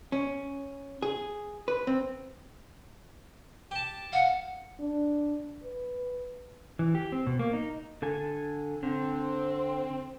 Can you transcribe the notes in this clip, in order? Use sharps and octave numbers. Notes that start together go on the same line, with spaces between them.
C#4
G#4
B4
C4
G4 A5
F5 F#5
D4
B4
E3
G4
C4
B2
A#3
D#4
D3 A4 G#5
D3 C4